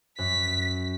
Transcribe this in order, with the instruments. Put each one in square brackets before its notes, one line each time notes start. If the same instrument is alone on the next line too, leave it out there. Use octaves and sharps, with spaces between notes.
[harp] F#2 [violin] B6